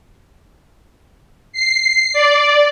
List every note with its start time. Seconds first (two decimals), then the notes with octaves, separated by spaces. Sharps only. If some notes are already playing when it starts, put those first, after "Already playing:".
1.52 C7
2.13 D5